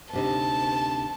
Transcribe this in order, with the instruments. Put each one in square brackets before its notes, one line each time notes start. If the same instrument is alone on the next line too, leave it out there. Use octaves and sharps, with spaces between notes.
[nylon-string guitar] D2 C3 D#4 [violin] A5